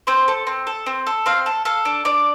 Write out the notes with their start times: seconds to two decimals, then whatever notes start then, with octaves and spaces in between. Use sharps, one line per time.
0.07 C4 C5
0.28 A4
0.47 C4
0.67 A4
0.86 C4
1.07 A4
1.26 C4 F5
1.46 A4
1.65 A4 F5
1.85 D4
2.05 D4 D5